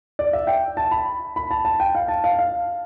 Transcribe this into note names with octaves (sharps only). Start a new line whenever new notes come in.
D5
E5
G5
A5
B5
B5
A5
A5
G5
F5
A5
F5
F5